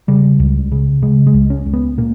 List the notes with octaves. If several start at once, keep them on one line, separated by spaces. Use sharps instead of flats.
C#3 G3
C#2
C#3
C#3 G#3
G#3
C#2
C#4
C#2
B3
A#2 A#3